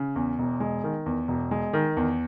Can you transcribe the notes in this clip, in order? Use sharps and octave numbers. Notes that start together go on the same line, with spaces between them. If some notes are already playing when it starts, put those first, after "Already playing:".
Already playing: C#3
E2
E1
G#3
D#3
E2
E1
G#3
D#3
E2